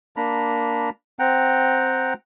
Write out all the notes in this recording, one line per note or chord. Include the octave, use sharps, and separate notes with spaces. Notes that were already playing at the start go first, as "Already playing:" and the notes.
A#3 D4 A#5 B5
C4 F#5 G5 A#5